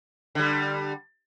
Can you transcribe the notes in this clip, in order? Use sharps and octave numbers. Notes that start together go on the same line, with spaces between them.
D3 G3